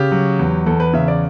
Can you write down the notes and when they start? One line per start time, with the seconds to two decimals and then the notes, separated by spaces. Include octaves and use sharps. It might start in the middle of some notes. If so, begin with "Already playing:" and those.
Already playing: C#3 G4
0.12 F#3
0.39 E2
0.66 E2 A4
0.80 B4
0.93 C#3 E5
1.08 D5